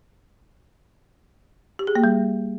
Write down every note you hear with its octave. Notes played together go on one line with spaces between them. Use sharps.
G4
G#4
A#3
G3